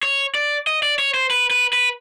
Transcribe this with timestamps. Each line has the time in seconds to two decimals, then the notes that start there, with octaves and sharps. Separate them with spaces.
0.03 C#5
0.35 D5
0.67 D#5
0.83 D5
0.99 C#5
1.14 C5
1.31 B4
1.51 B4
1.73 B4